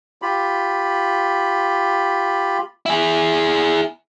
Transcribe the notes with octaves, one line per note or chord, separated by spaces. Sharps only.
F4 G4 B5
E4 G#4